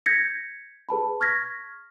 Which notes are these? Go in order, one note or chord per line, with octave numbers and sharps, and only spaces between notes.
G6 G#6 A#6 B6 C#7
G#4 B4 A5 B5
C#6 F6 G#6 A#6 B6